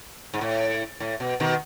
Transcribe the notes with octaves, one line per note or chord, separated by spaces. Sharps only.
G#2
A2
A2
B2
B2 D#3